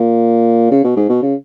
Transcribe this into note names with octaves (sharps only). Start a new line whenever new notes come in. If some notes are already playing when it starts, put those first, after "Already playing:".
Already playing: A#2
C#3
B2
G#2
B2
C#3